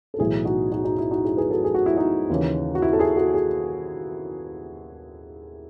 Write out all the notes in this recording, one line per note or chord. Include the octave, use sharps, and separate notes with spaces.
A4
B1 A2 E3 E4 G#4
D#4 F#4
D#4 F#4
D#4 F#4
E4
D#4 F#4
E4 G#4
G#4 B4
F#4 A4
G#4
F#4
E4
D#4 F#4
D#2 C#3 E3
F#4
E4
A4
E4 G#4
F#4 A4
G#4